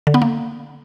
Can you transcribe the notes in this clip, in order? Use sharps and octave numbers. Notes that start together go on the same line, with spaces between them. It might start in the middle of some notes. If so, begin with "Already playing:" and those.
D3
B3
A#3